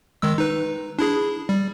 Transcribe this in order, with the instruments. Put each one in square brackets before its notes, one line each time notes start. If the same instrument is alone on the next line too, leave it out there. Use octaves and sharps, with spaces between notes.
[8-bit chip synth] D#3 G#3 E6
D#4 B4
D4 E4 G#4
G3